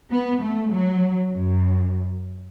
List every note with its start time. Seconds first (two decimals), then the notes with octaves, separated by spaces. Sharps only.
0.11 B3
0.42 A3
0.71 F#3
1.33 F#2